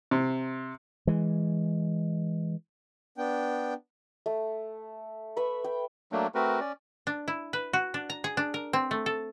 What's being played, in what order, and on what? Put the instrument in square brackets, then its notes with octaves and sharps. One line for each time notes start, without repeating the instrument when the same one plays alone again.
[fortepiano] C3
[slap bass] E3 G#3
[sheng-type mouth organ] B3 D4 G5
[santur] A3
B4 E5 B5 C#6
G5
[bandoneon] F#3 A3 A#3 D4
A3 C4 F#4 A#4 B4
C#4 D5
[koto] D4
E4
B4
F#4
D4
A#5
G#4
D4
A#4
C4
A3
A4